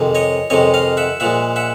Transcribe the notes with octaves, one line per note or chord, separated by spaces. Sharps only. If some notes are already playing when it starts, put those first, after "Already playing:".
Already playing: F2 C3 D#3 G#3
C#5 D#5
F2 C3 D#3 G#3 C#5 D#5
D#5 F5
E5 F#5
A#2 F3 G#3 E5 F#5
E5 F#5